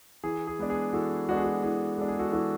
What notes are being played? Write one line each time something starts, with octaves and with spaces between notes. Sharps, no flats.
E3 G#4
G#4
G#3 B3 D4
G#4
E3 F#4 A4
G#3 B3 D4 F#4
G#4
F#4
E3 G#4
G#3 B3 D4 A4
G#4
F#4 A4
E3 F#4 A4